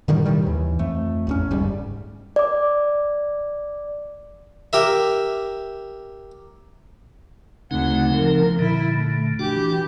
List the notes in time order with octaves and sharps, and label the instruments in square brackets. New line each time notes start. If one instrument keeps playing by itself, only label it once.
[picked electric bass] A2 D3 D#3 G3
A2 C3 D#3 G3
D#2 E3
F2 A3
A1 E2 C#4
F#1 D2 G#2 G3
[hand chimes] D5 D6
[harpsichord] G4 A#4 E5
[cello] D2 F#5 [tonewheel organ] C#3 C4 D#4
[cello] F3 A#4
[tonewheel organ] A#2 D3 [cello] E4
[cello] A3
[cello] E3 G4 [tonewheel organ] D4 F#4